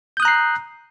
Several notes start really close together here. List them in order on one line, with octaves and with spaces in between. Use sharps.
G6 D#6 F#6 A#5 C7